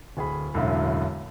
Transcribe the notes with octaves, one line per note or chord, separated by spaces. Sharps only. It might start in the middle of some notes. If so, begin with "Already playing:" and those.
D1 G#4 B5
E1 F#2 A2 D3 E5 F5